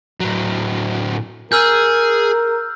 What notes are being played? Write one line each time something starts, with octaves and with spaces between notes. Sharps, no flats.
A2 F#3
G#4 A#4 E6 F6 G6